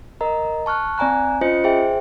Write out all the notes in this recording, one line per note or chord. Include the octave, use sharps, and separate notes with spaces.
A#4 D#5 A#5
A5 C#6 F6 F#6
C4 D5 G#5 A#5 F#6
C#4 F4 C5 D#5 C#7
G#4 C5 E5 G5